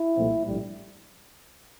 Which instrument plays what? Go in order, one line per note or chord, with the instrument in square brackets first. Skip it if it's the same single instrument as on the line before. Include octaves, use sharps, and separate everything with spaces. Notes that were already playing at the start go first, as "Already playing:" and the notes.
Already playing: [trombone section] E4
C2 A#2 F3 A3 C4
A#1 A2 G3